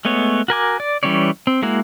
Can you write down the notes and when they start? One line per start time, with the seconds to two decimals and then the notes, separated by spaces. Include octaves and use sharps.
0.05 G#3 A3 B3 C#5
0.48 F#4 A#4 G#5 D6
0.80 D5
1.03 E3 G3 C#4 C#5 D5
1.47 C4
1.62 G#3 A#3 E4 F#4